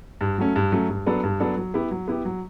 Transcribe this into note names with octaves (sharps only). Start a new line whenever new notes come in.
G2
F#3 A3 C#4
G2
F#3 A3 C#4
G2
F#3 B3 D4 A4
G2
F#3 B3 D4 A4
F#3
B3 E4 G4
F#3
B3 E4 G4
F#3